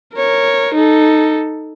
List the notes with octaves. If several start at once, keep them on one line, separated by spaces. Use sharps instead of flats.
A#4 C#5
D#4 A4